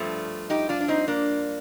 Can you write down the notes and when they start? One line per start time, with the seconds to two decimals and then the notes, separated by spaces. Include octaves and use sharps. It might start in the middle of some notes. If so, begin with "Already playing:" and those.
Already playing: G2 F3 A3
0.50 D#4 G4
0.69 D4 F4
0.81 D4
0.88 C4 D#4
1.08 A#3 D4